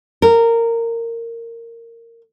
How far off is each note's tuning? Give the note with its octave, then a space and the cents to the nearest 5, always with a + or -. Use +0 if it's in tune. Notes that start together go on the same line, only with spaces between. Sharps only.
A#4 -15